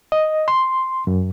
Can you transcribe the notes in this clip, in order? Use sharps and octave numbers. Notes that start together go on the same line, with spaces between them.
D#5
C6
F#2